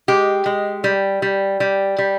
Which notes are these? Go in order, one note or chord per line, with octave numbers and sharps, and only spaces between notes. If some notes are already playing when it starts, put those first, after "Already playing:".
G#3 G4
G#3
G3
G3
G3
G3